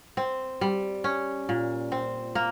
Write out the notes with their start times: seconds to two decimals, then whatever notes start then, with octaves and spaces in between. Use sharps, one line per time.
0.17 C4
0.61 G3
1.04 C#4
1.49 A#2
1.92 C4
2.35 A#3